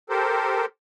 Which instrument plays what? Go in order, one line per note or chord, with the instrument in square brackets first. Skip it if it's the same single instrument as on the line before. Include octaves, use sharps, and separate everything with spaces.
[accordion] G4 A4 A#4 C5